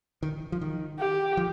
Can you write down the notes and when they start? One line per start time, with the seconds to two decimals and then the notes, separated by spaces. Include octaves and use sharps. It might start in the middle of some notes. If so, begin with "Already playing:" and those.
0.23 D#3
0.52 F3
0.61 D#3
0.99 G4
1.37 F3